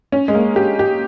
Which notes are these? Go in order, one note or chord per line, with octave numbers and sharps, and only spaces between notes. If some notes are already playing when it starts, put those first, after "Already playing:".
C#4
G#3
A#3
G4
G4